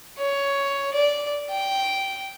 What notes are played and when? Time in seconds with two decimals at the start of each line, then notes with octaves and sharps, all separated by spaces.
0.19 C#5
0.94 D5
1.50 G5